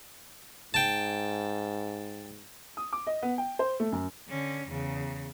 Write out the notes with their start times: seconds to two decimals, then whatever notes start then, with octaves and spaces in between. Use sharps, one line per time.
0.74 G#2 G5 A5
2.77 D#6
2.93 D6
3.07 D#5
3.22 B3
3.38 G5
3.59 C5
3.80 A3
3.92 F#2
4.28 D3 C#4
4.69 E2 C#3